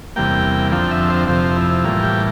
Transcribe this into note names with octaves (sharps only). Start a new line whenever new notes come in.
E2 C3 G3 A#3 G5
F2 D3 F3 C4 G5
E5
C5
F2 C3 F3 C5
E4
A2 E3 G3 A#3 F4
G4